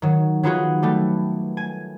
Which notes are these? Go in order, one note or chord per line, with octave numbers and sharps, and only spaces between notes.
D#3 F#3
F#3 B3 D#4 F4 F#4 G#4
G3 A3 B3
G#5